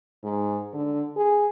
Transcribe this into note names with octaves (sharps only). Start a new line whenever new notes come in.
G#2
D3
G#4